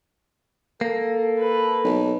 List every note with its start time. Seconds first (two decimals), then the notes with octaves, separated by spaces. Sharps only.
0.81 A#3 A4
1.39 B4
1.84 B1